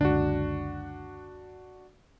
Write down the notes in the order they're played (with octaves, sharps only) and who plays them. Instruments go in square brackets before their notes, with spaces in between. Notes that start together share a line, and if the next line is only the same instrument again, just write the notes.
[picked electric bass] F#1 C#2 D3 [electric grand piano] D4 F#4